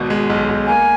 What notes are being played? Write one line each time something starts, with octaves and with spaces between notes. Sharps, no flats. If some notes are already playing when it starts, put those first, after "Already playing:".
Already playing: G#1 B2
G#3
B1
B1
A#3 G#5